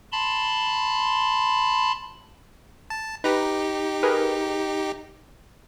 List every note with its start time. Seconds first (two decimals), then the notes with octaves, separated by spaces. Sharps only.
0.12 A5 B5 C6
2.90 A5
3.24 D#4 G4 B4 A#5
4.03 G#4 A#4 B4